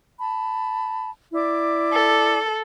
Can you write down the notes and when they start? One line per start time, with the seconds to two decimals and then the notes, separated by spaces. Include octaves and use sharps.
0.19 A5 B5
1.33 E4 D5 D6
1.92 A4